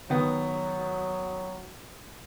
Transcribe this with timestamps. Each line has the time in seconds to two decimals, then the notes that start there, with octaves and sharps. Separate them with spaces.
0.10 D#3 F#3 B3